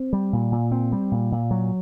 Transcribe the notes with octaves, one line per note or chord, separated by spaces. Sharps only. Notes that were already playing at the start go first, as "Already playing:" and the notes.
Already playing: C4
G3
A#2
A#2
C4
G3
A#2
A#2
F#3